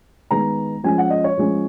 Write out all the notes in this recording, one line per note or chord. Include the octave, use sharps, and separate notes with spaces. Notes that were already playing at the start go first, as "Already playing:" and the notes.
D#3 G#3 B3 A#5
F3 G#3 C#4 G#5
F#5
D#5
C#5
F3 G#3 C#4